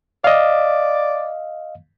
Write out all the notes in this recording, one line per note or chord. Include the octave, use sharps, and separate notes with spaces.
D5 D#5 F5